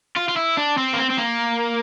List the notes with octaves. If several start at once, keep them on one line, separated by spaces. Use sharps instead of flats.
F4
F4
E4
D4
C4
A#3
C4
C4
A#3